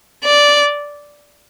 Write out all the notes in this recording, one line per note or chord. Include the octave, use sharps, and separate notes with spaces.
D5